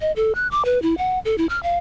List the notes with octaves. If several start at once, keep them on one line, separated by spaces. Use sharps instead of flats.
D#5
A4
F#6
D6
B4
E4
F#5
A4
E4
F6
F5